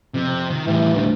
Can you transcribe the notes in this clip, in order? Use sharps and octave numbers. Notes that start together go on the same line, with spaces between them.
F2 C3
D#3
A2 E3 G3
D2